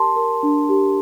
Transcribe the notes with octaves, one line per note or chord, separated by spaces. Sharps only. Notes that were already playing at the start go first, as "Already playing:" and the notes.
Already playing: G4 A#4 A5 C6
A#4
D4
G4